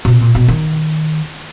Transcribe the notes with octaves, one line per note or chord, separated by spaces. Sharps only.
B2
C3
A#2
B2
D#3